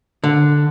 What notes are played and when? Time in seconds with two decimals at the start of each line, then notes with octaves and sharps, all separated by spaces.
0.24 D3